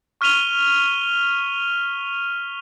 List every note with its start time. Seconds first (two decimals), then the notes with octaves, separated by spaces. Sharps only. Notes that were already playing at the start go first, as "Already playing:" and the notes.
0.21 C#6 F6 B6 D#7 F7 G7